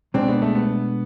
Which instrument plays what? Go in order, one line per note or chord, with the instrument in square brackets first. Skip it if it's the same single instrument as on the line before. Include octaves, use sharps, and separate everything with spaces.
[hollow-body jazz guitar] B2 G#3 D4 [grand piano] C4
[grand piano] B3
A3
B3